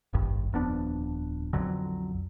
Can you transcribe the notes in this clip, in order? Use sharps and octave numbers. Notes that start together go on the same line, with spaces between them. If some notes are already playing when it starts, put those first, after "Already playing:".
D#1 G#1 G2
D#1 F2 B3 D4
B1 F2 D3 F#3